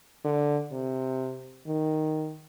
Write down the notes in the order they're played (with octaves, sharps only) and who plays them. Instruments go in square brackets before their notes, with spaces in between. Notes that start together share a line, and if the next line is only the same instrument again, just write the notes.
[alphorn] D3
C3
D#3